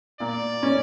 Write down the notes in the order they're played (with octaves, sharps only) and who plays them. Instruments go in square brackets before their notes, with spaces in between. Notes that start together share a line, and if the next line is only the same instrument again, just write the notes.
[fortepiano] A#2 [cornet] D5
[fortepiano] C#4